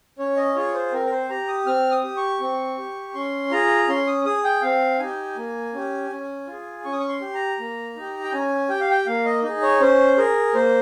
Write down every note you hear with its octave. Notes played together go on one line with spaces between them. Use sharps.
C#4 C#5
D#5
F4 G#4 C#5
C5
C4 A#4
A#4
C5
G4 A#5
D#6
C4 F6
D#6
G4
C#6
C4
G4
C#4 C6
F4 G#4 A#5
C#4 C6
D#6
G#4 D#6
G5
C4 F5
D#4 G4 G#5
A#3
C#4 G4
C#4
F4 G#4
C#4 C#6
D#6
C#6
C6
G4
A#5
A#3
D#4 G4
G5
C#4 G#5
G4 G5
F5
G5
A#3 F5
D#5
D#4 G#4 D#5
C#5
C#4 C5
G#4 A#4
A#3 C5